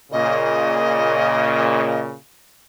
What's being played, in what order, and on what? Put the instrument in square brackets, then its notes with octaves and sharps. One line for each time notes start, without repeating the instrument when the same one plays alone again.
[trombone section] A#2 C#3 [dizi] D#5